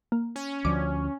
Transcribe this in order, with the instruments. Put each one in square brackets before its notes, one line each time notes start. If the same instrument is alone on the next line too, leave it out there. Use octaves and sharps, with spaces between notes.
[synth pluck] A#3
[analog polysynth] C#4
[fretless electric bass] D2 F3 [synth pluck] D5 D6